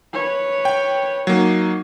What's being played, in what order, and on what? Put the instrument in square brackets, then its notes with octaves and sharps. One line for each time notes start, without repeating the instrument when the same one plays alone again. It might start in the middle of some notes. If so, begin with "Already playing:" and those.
[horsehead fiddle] B4 C#5
[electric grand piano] G5
[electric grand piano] F#3 A#3 [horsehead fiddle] D#4